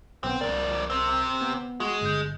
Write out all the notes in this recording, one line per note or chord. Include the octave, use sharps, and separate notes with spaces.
B1 B3 C4 G5
C2 F2 A#4 D5
C3 C4
B3
G#3 F#4
G1 G2 G6